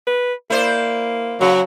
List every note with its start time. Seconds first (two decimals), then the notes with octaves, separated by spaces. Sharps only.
0.07 B4
0.50 A#3 E4 C5 D5
1.41 C#3 F#3